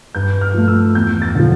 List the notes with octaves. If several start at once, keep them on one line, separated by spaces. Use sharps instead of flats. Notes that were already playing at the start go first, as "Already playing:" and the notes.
G2 G6
F6
F3 A3
E6
E2 G6
A6
D3 F3